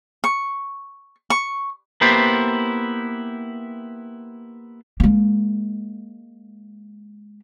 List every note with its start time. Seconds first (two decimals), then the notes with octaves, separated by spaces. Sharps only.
0.24 C#6
1.30 C#6
2.01 A#3 B3 E4 G4 C5
5.00 G#3 A#3